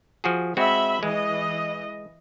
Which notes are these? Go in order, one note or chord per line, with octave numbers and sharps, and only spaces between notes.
F3 F#4 G#4
G#3 C4 F#4 E5 B5
E3 G#3 D#5